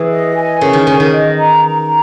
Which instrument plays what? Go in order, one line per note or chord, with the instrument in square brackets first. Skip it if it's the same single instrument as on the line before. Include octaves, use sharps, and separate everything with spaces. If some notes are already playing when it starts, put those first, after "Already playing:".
Already playing: [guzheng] E3 [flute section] G#4
[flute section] D#5
G#5
[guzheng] C#3 [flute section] A#4
[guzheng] D#3
[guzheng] C#3 [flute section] A#4
[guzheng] D#3
[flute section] D#5
A#5
A#5